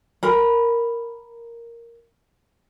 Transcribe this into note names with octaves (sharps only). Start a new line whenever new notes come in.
A#4 B5